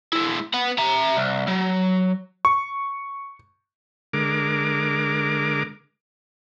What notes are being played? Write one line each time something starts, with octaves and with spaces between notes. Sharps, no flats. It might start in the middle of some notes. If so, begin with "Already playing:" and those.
G#3 E4
B3 F#5
E5 A#5
C2
F#3
C#6
D3 G#3 A#4 D6